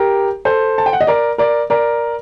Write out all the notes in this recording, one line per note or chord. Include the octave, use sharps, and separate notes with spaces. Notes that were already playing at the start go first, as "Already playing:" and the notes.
Already playing: G4 A#4
A4 C5
A5
G5
F#5
D#5
A#4 D5
A#4 D5
A#4 D5